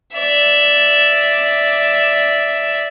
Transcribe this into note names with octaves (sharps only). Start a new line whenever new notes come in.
D5 E5